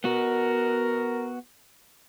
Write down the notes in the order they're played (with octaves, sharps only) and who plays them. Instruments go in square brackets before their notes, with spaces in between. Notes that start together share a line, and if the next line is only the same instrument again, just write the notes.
[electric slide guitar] B3 F#4 [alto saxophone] A#4